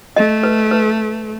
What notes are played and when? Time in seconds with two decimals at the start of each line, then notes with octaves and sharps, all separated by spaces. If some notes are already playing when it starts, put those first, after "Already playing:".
0.16 A3 D#5
0.43 B4
0.71 B4